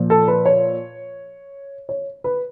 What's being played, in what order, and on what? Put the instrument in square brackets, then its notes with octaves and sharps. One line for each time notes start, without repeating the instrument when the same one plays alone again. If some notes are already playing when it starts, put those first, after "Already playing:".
Already playing: [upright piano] A#2 F3
A4
B4
C#5
C#5
B4